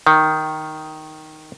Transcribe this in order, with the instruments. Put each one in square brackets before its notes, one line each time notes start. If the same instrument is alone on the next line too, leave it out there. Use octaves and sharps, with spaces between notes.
[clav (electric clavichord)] D#3